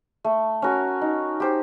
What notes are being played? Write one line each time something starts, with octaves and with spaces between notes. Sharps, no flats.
A3
C#4 F#4 A#4
D#4
G4 C5